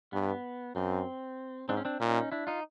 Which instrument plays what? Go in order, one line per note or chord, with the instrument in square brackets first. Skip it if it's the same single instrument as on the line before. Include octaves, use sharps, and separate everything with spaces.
[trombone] G2 [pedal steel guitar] B3
[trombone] F#2 [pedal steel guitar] C4
[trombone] G#2 [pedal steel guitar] C4 D4
[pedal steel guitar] C#4
C4 D4
[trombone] A#2 [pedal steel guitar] C#4 D#4
[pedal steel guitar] D4 E4
D#4 F4